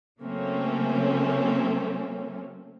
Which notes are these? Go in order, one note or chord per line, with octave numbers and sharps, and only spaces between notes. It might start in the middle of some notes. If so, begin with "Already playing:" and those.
C#3 F#3 A3 A#3 C4 C#4